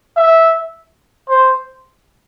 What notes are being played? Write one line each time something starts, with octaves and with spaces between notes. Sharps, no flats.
E5
C5